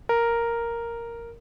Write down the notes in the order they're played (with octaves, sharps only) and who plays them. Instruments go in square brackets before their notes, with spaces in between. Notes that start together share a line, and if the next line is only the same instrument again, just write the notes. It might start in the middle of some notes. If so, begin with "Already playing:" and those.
[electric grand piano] A#4